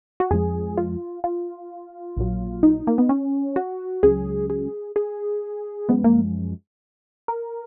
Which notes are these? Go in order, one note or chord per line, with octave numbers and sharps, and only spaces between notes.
F#4
F2 F3 G#3 G#4
F4
F4
A#1 A#2 F#3
D#4
A#3
B3
C#4
F#4
C#2 C#3 F#3 G#4
G#4
G#4
F#2 F3 G#3 B3
A#3
A#4